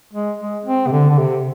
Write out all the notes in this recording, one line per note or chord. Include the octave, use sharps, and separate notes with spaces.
G#3
G#3
C4
C3
D3
D3
C3